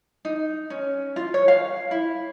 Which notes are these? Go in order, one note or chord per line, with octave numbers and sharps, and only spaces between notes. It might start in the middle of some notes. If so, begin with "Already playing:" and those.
D#4
C#4
F4
C#5
F5
E4